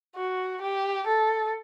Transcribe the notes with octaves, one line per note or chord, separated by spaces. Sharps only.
F#4
G4
A4